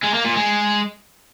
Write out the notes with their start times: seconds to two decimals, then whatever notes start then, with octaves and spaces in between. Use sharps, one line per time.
0.03 G#3
0.14 A#3
0.25 A#2
0.35 G#3